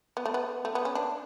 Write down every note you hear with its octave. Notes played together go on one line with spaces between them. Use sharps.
B3
A3
B3
A3
B3
C#4
D4